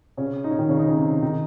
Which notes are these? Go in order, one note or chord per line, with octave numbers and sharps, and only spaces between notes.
C#3 C#4
D#4
C#4
D#3 D#4
C#3 C#4
D#4
C#4
C3 C4
D#3 D#4